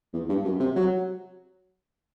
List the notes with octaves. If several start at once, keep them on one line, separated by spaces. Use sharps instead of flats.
E2
G2
F#2
C3
F#3